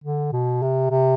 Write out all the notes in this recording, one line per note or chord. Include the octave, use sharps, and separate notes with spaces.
D3
B2
C3
C3